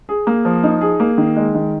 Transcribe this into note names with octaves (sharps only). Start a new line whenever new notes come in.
G#4
A#3
F3
D#4
G#4
A#3
D#3
G#3
D#3